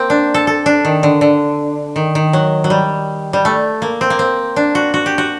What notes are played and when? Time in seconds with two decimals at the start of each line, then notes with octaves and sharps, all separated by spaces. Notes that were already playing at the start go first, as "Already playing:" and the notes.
Already playing: A#3 C4
0.10 D4
0.34 A4
0.47 A4
0.66 D4
0.85 D#3
1.03 D3
1.21 D3
1.96 D#3
2.15 D#3
2.33 F#3
2.64 F#3
2.70 G3
3.33 G3
3.45 A3
3.82 A#3
4.01 C4
4.10 A#3
4.19 C4
4.56 D4
4.75 F#4
4.94 F#4
5.06 G4
5.18 F#4